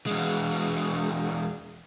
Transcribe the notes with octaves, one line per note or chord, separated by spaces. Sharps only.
E2 G#3